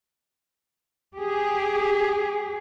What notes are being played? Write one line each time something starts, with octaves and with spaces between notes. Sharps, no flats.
G4 G#4